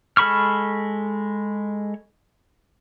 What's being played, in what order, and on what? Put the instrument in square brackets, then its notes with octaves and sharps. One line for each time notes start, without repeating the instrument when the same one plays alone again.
[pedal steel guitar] G#3 A4 B5 C#6 F6